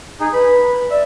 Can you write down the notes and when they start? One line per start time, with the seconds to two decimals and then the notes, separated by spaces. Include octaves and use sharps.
0.20 D#4 G#4
0.33 B4 B5
0.90 D5 E5